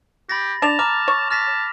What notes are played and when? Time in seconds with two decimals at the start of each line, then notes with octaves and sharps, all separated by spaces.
0.29 G4 B5 A6 A#6
0.62 D4 A5 E7 F7
0.79 A#5 D6 F6
1.08 C#5
1.31 A5 F6 A#6 B6